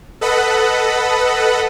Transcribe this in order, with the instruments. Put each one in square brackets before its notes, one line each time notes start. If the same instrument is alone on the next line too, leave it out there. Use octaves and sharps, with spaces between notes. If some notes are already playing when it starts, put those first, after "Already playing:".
[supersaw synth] A4 B4 D#5 F#5 B5